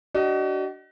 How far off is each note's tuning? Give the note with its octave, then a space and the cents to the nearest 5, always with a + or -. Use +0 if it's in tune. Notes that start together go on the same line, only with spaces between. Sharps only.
D4 +0 F#4 +40 D#5 +0